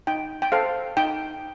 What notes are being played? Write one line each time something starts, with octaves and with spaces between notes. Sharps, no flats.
D#4 G5
G5
A4 C5 F5
D#4 G5